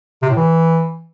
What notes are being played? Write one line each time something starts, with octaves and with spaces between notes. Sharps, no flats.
C3
A2
E3